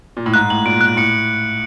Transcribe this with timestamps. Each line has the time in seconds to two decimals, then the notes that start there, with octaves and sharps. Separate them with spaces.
0.17 A#2
0.26 A2
0.34 G#2 F#6
0.50 A2 F#7
0.66 A#2 D7
0.81 F#6
0.97 A2 C#7